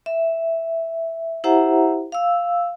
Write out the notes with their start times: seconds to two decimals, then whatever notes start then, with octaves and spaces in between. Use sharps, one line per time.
0.06 E5
1.44 E4 G4 C5 E5 F#5 A#5
2.12 F5 E6